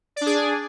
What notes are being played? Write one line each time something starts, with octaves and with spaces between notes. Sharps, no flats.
D4 G#4 D5